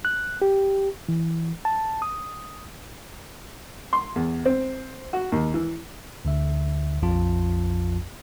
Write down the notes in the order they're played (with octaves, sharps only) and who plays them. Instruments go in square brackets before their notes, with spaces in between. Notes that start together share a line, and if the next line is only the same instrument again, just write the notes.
[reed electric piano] F#6
G4
E3
A5
D#6
[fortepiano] C6
E2
C4
F#4
D#2
E3
[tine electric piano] D2 D3 E5
A#1 F2 F3 F4 A5